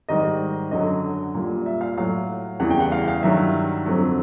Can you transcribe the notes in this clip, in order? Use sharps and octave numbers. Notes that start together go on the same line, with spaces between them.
G#2 D#3 G3 D#5
F#2 D3 F#3 D#5
A#2 G3
E5
F5
A2 F#3 F5
E2 C#3 E3 G3 F#5
G5
F#5
F5
F5
G2 D#3 F#3 E5
F2 D3 F#3